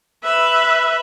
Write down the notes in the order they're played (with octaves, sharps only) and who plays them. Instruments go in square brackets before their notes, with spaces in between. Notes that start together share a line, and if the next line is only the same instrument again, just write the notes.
[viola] B4 E5